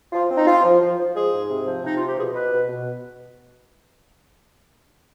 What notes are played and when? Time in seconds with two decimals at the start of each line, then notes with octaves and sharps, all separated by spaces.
0.13 F3 F4
0.30 C4
0.36 D#4
0.47 C4 F4
0.63 F3
0.81 F3
0.98 F3
1.14 G#3 G#4
1.31 G#2
1.49 C3
1.66 F3
1.83 C3 D#4
1.95 F3 F4
2.06 G4
2.17 B2 G#4
2.34 B2 B4
2.51 B2
2.68 B2